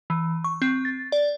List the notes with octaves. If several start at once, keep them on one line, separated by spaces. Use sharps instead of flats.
E3
C#6
C4
A6
D5